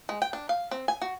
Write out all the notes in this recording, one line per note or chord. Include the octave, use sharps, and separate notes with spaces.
G#3
G5
D4
F5
C4
G#5
F#4